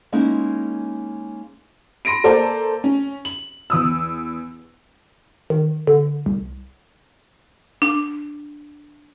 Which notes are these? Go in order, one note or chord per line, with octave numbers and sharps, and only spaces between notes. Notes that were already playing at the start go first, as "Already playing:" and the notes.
G#3 A#3 C#4 D#4 E4 G#4
B5 C6 A#6 D7 D#7
A#3 A4 C5 D5 A#5
C#4
F#7
E2 D#6 E6
D#3
D3
C2
D4